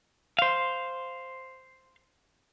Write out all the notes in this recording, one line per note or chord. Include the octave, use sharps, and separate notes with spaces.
C5 F5